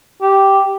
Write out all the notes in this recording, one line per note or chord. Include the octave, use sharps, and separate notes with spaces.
G4